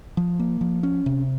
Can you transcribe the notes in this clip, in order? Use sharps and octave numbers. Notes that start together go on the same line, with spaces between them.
F3
A#3
F3
C#4
C3